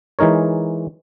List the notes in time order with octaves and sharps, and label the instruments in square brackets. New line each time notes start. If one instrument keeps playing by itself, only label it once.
[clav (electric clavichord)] E3 G#3 D#4 A#4 C#5